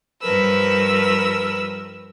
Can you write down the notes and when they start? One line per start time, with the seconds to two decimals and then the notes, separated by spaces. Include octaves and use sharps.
0.21 G2 F3 A#4 B4 E6